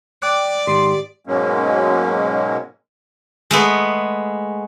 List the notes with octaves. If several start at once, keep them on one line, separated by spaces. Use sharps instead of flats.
D5 G5 D6 F#6
G#2 D#3 G4 C6
G#2 B2 F#3 G#3 A#3 C#4
G#3 A3 B3